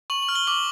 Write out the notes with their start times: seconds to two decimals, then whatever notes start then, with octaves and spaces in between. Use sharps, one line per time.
0.10 C#6 F#7
0.22 F#7
0.29 F6
0.35 G7
0.47 D6 F#7